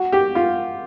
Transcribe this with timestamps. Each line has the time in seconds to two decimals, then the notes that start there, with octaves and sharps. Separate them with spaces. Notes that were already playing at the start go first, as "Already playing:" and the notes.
Already playing: F#4
0.12 G4
0.35 F4